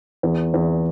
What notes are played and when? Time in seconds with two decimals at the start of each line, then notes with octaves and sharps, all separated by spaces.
0.23 E2
0.54 E2